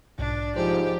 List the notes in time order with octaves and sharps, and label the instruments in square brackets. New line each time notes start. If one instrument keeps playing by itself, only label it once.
[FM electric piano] B1 G#2 [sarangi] D4
[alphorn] G#2 [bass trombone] F3 [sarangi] G4 [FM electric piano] C5 A5